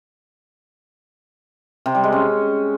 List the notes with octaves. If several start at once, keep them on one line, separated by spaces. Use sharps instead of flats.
C3
G3
G#3
C#4